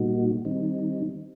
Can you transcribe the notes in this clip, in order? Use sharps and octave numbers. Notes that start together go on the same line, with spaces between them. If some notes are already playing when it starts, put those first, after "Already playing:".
Already playing: A#2 G3 A#3 D#4 F#4
D#3 G3 C4 D#4